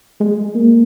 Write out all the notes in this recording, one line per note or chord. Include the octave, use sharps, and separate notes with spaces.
G#3
A#3